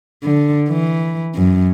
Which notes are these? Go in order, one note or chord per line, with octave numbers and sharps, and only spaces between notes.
D3
E3
F#2